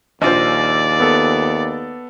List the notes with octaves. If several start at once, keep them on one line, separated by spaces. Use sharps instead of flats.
A#1 D#2 F4 C5 D5
B3 A4